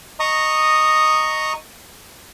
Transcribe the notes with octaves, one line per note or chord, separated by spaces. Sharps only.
D#5 A#5 C#6 D#6